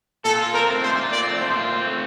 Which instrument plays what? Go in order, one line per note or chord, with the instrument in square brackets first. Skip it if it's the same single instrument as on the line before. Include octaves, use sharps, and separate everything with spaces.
[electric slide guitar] A#2 [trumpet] A4
[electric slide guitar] F4
[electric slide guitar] C4 [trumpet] A#4
[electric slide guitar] A3
[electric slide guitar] A#2 [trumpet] C5
[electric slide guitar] F4
[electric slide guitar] C4 [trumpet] D5
[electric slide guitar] A3
[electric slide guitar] A#2 [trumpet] C5
[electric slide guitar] F4
C4
A3